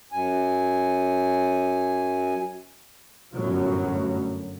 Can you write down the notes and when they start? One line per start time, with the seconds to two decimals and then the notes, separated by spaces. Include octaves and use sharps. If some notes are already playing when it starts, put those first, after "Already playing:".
0.12 F#2 G#5
3.34 G1 F#2 A2 F#3